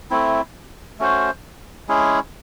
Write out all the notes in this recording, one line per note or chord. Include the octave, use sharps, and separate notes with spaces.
A3 C4 E4
A3 C#4 F#4 C5
G#3 C#4 E4 G#4